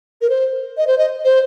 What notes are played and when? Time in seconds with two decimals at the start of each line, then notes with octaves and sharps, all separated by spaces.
0.21 A#4
0.30 C5
0.77 D#5
0.87 C5
0.98 D#5
1.25 C5